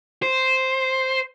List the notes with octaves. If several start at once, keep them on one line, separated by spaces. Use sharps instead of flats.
C5